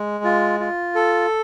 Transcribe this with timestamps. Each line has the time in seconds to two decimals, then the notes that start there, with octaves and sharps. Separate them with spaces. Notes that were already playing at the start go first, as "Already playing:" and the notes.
Already playing: G#3
0.24 F4
0.60 F4
0.95 A4